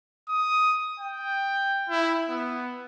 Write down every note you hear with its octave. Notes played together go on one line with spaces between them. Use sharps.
D#6
G5
E4
B3